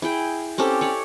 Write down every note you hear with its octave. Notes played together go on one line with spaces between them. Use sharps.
E4 G#4 G5
C4 C#4 G4 A4
C#5 D5